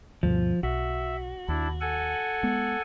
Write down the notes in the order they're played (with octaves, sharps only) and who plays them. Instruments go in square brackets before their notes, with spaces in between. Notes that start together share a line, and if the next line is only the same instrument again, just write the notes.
[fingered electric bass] D2 G2 B2 [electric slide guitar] F3
[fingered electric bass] B1 [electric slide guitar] F#4 [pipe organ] E5
[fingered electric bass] D#2 [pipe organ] D4 E4
[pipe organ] A4 F#5 G#5
[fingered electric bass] G#3 B3